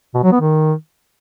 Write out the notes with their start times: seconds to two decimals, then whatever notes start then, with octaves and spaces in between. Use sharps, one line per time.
0.15 B2
0.23 F#3
0.32 B3
0.41 D#3